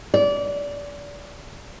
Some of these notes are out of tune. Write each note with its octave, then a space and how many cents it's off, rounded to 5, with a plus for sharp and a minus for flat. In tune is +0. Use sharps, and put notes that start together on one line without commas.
D5 -30